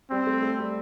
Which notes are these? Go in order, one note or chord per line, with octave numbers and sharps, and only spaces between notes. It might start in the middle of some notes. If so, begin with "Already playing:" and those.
G3 C4
A3
A3
G3